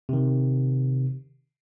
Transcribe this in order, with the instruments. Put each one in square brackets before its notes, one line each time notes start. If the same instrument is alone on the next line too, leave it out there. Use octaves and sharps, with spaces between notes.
[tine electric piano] C3 D#3